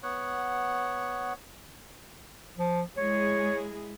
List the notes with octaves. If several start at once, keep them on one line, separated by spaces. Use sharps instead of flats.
B3 C#5 F#5
F3
G#3 E4 G#4 C#5